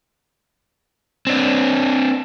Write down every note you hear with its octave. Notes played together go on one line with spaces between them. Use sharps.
C4 D4